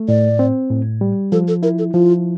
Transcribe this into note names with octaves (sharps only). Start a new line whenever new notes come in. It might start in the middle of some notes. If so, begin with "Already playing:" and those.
Already playing: A3
A2 D5
C4
A2
G3
F3 A4
A4
E4 A#4
A4
F3 F4